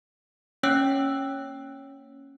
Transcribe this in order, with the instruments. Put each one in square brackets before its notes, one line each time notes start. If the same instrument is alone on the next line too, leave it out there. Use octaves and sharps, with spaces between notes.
[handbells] A#3 C#4 C#5 G5 E6 F#6